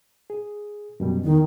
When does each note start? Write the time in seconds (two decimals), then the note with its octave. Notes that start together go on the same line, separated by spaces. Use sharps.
0.30 G#4
1.00 F#2 B2 G3
1.24 E2 D#3 D#4